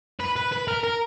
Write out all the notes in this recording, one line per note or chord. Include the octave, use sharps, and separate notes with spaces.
B4
B4
B4
A#4
A#4